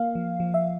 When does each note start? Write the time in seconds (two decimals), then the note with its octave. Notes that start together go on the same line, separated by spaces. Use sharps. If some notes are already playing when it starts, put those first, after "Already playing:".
Already playing: A#3 F5
0.15 F3
0.40 F3
0.54 E5